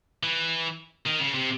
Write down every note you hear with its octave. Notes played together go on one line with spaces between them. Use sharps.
E3
D#3
C#3
C3